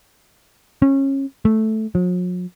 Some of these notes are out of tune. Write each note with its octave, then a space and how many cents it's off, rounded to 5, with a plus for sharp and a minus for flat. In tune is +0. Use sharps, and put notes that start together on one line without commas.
C#4 -25
A3 -5
F#3 -45